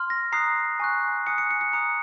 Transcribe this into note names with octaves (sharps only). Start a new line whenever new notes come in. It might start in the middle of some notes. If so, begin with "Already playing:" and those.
Already playing: C6 F6
A#6
A#5 D#6 F#6 C7
G#5 C#6 F#6
G#5 D#6 F#6 C#7
C#7
C#7
C#7
A#5 D#6 F#6 C#7